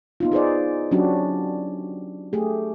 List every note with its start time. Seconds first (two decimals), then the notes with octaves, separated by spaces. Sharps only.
0.20 B3 D#4 F4
0.32 D#4 G#4 C5 D5
0.91 F#3 C#4 D4 F#4 G4
2.33 A3 G4 G#4